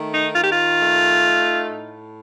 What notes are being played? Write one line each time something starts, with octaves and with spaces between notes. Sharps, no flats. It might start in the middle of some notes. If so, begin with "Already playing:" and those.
Already playing: D#3 A3
D#4
D#3 F4
G4
F4
A3
D#4
A2